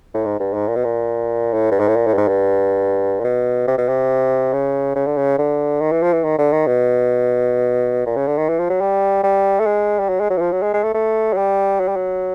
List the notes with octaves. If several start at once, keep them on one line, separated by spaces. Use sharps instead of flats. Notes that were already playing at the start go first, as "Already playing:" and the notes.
A2
G#2
G2
G#2
A#2
B2
A#2
A2
G2
G#2
A2
A#2
A2
G2
G#2
G2
A#2
B2
C3
B2
C3
C#3
C#3
D3
C#3
D3
D#3
E3
F3
E3
D#3
D3
D#3
B2
A#2
C#3
D3
D#3
E3
F3
F#3
G3
G3
A3
G#3
G3
F#3
G#3
F#3
E3
F3
F#3
G#3
G#3
A3
A3
F#3
G3
F#3
G3
F#3